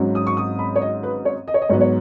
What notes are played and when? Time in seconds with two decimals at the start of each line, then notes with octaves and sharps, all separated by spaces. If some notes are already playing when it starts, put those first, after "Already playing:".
Already playing: G#1 G#2 F#3 C#4
0.15 D#6
0.27 C#6
0.37 D#6
0.59 B5
0.76 C#5
0.82 D#5
1.03 B4
1.25 C#5
1.48 D#5
1.54 C#5
1.62 D#5
1.69 G#2 F#3 B3 C#5
1.81 C#5